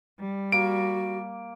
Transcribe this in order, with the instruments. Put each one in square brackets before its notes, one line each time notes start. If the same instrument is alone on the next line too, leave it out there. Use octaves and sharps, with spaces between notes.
[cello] G3
[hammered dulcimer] A#3 [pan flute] F#4 [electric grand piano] D7